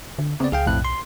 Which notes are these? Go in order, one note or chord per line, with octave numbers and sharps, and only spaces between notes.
D3
C#3 B3 C4 D5
C#2 G#4 F5 G5
B1 F2 A2 F#6
C6